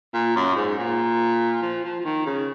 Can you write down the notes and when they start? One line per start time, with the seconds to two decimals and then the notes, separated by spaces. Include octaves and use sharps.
0.14 A#2
0.36 F#2
0.56 G#2
0.78 A#2
1.62 F3
1.84 F3
1.99 F3
2.05 D#3
2.26 C#3